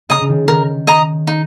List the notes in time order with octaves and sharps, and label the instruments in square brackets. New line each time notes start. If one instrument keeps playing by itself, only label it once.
[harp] C#3 [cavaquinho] D#5 A#5 D#6
[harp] C#3
D#3
[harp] D#3 [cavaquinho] A#4
[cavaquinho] D#5 A#5 D#6
D#4